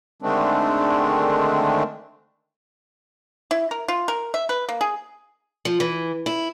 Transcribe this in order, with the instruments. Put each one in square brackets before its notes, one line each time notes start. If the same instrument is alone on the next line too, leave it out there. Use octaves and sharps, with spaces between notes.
[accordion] D3 D#3 G#3 A3 C4 D4
[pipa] E4
A#4
F4
A#4
E5
B4
A#3
G#4
[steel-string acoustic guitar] F3
E3
E4